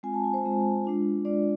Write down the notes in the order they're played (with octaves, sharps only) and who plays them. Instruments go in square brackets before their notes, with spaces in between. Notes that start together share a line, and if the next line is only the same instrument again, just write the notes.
[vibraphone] G#3 C4 F4 G#5
A5
G#5
C5
G#3 C4 F4
G#3 D4 F4
G#3 D4 F4 D5